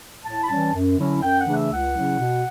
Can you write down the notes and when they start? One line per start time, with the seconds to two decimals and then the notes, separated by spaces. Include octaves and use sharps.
0.23 A2 A5
0.41 B5
0.48 E3 G3 C#4 A5
0.73 F#2
0.97 D3 F#3 C#4 E4
1.21 F#2 G5
1.38 F#5
1.46 C#3 E3 A3 D4
1.54 E5
1.70 C#2 F#5
1.95 C#3 F#3 C#4 E4
2.19 B2